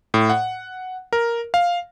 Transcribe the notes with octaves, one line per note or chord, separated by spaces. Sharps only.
A2
F#5
A#4
F5